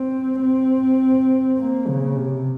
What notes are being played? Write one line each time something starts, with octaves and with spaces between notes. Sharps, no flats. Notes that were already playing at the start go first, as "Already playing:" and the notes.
Already playing: C4
C4
A#3
C#3
C3